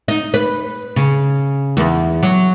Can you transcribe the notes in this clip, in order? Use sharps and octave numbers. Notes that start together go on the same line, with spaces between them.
D#4
B4
C#3
E2
F#3